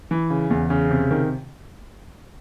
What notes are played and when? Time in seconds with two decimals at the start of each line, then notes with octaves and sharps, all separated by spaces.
0.11 E3
0.30 C#3
0.50 E2
0.70 C#3
0.91 C3
1.11 D#3